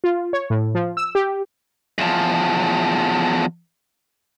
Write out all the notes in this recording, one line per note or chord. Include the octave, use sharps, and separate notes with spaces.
F4
C#5
A2
F3
E6
G4
E2 F3